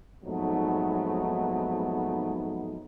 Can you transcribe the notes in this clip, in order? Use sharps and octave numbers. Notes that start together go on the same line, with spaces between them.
F2 G#2 F#3 A3 B3 D#4